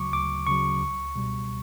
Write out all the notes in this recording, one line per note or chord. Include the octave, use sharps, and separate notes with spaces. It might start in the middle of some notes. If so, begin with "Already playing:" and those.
Already playing: D2 C#3 F#3 C#6 D6
D2 D6
C#3 F#3 C#6
C#2
B2 G3